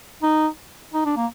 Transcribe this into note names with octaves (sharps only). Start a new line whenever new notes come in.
D#4
D#4
D4
A#3